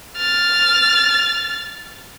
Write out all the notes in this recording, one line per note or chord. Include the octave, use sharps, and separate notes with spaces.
F6 A6